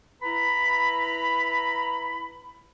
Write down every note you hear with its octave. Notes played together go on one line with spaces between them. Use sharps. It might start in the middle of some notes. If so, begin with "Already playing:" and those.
E4 B4 A#5 B5